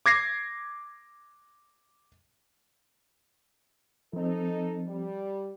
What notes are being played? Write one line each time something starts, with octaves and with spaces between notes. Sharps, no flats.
D6 G#6 A#6 C7
F3 C4 D#4 A4
G3